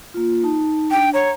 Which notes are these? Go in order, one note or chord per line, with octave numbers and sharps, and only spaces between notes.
A#3 F4
D#4 A5
D4 G5
C#5 F#5 A#5